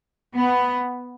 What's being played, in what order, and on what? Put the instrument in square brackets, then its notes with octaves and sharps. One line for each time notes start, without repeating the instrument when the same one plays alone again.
[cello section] B3